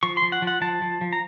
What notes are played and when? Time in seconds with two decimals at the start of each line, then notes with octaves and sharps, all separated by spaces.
0.03 F3 C#6
0.17 C6
0.22 F3
0.32 F#5
0.42 F3
0.47 F#5
0.61 F3 A5
0.82 F3
1.01 F3
1.13 A#5